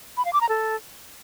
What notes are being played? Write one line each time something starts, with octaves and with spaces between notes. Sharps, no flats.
B5
F5
D6
A#5
A4